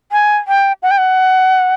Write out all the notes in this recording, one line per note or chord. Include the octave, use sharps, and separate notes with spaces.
G#5
G5
F#5
G5
F#5